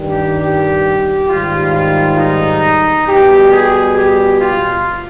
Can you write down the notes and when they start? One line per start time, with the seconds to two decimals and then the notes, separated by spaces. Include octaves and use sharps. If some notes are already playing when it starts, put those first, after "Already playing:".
Already playing: G2 D#3 G3
0.11 G4
0.40 G4
1.29 G#2 D#3 G3 F4
1.75 F4
2.19 D#4
3.08 B2 G3 G4
3.53 G#4
3.97 G4
4.41 F4